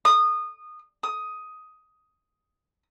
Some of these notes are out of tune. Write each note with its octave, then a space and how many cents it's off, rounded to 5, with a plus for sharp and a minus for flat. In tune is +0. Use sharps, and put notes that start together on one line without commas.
D#6 -20
D#6 +10